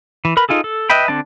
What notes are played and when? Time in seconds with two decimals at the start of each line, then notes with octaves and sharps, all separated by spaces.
0.25 E3
0.37 A#4 B4 B5
0.49 D#4 F4 G#4 A4
0.64 A4
0.90 B4 D#5 E5 G5 B5
1.08 D3 C4 D4 A5